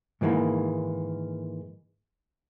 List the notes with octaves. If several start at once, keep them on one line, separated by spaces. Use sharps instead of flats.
G#2 D#3 E3 G#3 A#3